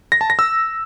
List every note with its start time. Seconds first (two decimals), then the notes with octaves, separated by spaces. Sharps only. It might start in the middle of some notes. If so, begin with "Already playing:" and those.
0.12 A#6
0.21 A5
0.30 A#6
0.39 E6